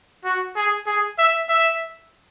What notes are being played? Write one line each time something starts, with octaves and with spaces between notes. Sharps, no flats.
F#4
G#4
G#4
E5
E5